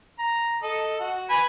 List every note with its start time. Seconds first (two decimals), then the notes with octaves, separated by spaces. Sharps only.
0.19 A#5
0.63 A4 D#5
1.00 F#4
1.30 B4 G#5 B5